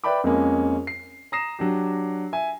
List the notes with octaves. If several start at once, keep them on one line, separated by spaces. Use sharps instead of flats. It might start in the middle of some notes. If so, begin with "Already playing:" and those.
B4 D5 E5 G5 B5 D6
F2 G#3 A#3 C#4
C7
A#5 D#6 A#6 C7 E7
F#3 D4 G4
E5 G#5